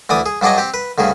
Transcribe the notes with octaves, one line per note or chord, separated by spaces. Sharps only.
D2 E3 D5 D#6
G#4
G2 F#3 D4 G#4 D5 D#5
C4 G4
B4
D2 G2 C#3 G#4